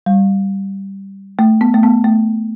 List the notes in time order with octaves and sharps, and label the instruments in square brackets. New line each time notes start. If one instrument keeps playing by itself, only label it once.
[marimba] G3
A3
B3
A3
B3
A3